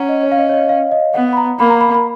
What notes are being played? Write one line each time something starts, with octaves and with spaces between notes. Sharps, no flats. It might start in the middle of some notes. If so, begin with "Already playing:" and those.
Already playing: C#4 F#5 A#5
D#5
C#5
F5
D#5
C#5
D#5
F5
D#5
B3 F#5
B5
A#5
A#3 B5
A#5
B5
B5